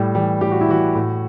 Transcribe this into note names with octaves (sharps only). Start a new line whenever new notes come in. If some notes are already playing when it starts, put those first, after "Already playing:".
Already playing: A2 G3
E3 G3
A2 G4
F#4
E4
E3 F#4
A2